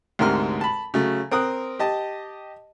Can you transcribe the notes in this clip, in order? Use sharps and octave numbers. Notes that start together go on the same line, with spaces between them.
D2 G#2 C3 A#4 F6
A5 B5
C#3 F#3 A3
C4 A#4 D#6 F#6
G4 D#5 A5